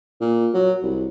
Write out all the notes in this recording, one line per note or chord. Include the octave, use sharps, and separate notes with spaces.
A#2
F#3
C2